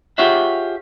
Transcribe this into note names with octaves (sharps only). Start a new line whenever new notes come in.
F4 G4 G#4 C#5 E5 F#5